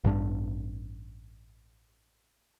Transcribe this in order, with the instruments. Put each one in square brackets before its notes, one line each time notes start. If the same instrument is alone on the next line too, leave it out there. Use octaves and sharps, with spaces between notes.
[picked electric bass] A1 G2 D4